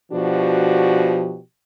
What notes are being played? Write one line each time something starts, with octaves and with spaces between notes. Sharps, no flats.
B2 F3 D4 F#4 G4